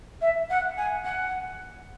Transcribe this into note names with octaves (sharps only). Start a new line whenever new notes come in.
E5
F#5
G#5
F#5